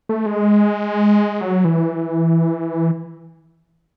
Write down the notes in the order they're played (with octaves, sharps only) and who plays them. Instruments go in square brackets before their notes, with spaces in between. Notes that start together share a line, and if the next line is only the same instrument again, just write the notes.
[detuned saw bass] A3
G#3
F#3
E3